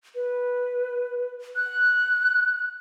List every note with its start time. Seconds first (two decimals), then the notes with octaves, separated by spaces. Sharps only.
0.15 B4
1.56 F#6